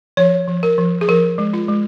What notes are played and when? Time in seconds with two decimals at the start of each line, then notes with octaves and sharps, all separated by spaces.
0.17 F3 C#5
0.48 F3
0.63 A#4
0.78 F3
1.01 G#4
1.08 F3 A#4
1.38 G#3
1.54 F4
1.69 G#3